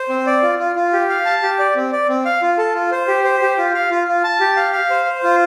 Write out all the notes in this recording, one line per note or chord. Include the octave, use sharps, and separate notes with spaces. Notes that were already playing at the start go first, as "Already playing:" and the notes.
Already playing: C5
C4
D5
F4
F4
F4
G4
F5
A5
G4
D5
C4
D5
C4
F5
F4
A4
F4
C5
G4
C5
G4
F4
F5
F4
F4
A5
G4
F5
F5
C5
C5
F4